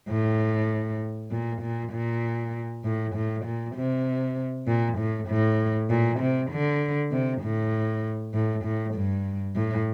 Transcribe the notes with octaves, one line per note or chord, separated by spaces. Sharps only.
A2
A#2
A#2
A#2
A2
A2
A#2
C3
A#2
A2
A2
A#2
C3
D3
C3
A2
A2
A2
G2
A2